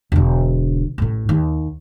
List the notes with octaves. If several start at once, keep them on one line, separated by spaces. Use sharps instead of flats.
E1 D3
A1 A2
D#2